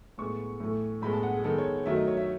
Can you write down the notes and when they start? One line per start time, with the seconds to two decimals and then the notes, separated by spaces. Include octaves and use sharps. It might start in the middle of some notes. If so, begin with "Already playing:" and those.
0.18 A2 G#3 B3 C#6
0.60 A2 E3 A3
1.02 A2 G#3 B3 B5
1.13 A5
1.23 F#5
1.34 G#4
1.44 D#3 G#3 B3 A4
1.58 C#5
1.86 D#3 F#3 A3 E5
1.96 D#5
2.07 C#5
2.17 E5